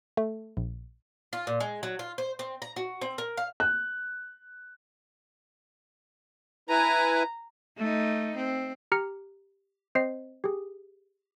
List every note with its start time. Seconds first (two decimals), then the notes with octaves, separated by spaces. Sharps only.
0.17 A3
0.57 A#1
1.33 F4
1.47 A#2
1.60 G#3
1.83 F#3
1.99 F4
2.18 C5
2.39 C4
2.62 A#5
2.76 F#4
3.02 C4
3.18 A#4
3.37 F5
3.60 F#6
6.69 E4 B4 G#5 A#5
7.78 A3 D#4
8.36 C4
8.92 G4 A#5 F6 C#7
9.95 C4 C5 D#5 C7
10.44 G4 G#4